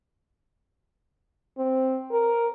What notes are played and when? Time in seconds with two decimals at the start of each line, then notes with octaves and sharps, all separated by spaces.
1.57 C4
2.12 A#4